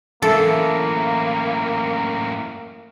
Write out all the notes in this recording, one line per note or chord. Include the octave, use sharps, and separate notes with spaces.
F#2 A2 E3 A#3 A4 E5